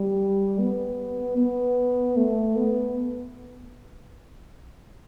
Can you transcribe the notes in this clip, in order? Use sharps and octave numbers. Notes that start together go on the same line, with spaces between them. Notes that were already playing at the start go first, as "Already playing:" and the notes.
Already playing: G3
B3
B3
A3
B3